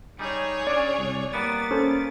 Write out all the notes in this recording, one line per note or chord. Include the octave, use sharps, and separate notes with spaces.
G3 D#4 G#4 C#5
C#4 D4 D5
C2
G3 A#3 B3 A6
C#4 A4 C5